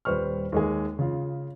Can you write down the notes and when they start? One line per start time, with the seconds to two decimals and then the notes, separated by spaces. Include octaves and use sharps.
0.05 D#1 G3 B4 C5 C#6 F6
0.52 D#2 G#3 G#4
0.99 C#3 F4